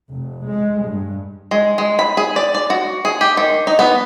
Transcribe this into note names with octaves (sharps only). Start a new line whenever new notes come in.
F1
G#3
G2
G#3
G#3
B5
G#4
D5
D5
F#4
G#4
G4
D#3
D#4
B3